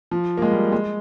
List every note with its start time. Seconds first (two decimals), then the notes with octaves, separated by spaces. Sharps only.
0.11 F3
0.38 A#3
0.42 G#3
0.52 G3
0.72 G#3